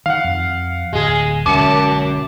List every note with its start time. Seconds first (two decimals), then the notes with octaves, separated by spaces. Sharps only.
0.06 D#3 F5 F#5
0.24 F2
0.93 D1 G#3 G#4
1.46 B1 F#2 D3 G#3 A5 D6 C#7